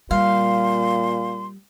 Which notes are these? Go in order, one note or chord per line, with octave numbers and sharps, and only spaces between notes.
A#2 G3 F5 C6